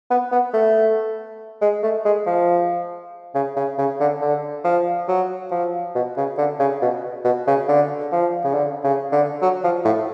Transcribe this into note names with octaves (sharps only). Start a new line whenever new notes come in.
B3
B3
A3
G#3
A3
G#3
F3
C#3
C#3
C#3
D3
D3
F3
F#3
F3
B2
C#3
D3
C#3
B2
B2
C#3
D3
F3
C#3
D3
C#3
D3
F#3
F3
A2